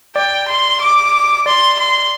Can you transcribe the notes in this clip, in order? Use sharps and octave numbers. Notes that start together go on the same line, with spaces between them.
D5 G5
C6
D6
D5 C6
C6